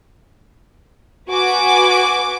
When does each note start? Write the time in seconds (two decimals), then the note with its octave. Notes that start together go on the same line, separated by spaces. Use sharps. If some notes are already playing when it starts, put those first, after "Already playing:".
1.31 F#4 B4 G#5 D6 D7